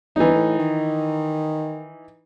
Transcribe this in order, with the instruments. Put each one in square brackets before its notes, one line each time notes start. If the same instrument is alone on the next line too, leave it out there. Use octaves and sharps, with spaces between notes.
[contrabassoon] G1 [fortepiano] E3 D#4
[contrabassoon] A2
D#3